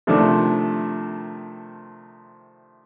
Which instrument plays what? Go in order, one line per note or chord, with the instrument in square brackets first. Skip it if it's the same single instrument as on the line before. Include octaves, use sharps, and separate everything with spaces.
[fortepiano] C3 D#3 F3 A3 D4